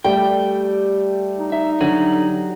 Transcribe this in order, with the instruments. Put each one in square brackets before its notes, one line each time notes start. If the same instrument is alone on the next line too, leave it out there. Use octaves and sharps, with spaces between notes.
[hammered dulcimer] G3 [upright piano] A3 [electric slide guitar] G5
[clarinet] D#4
[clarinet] D#4 [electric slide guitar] E5
[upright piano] D3 D#7 [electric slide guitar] F#3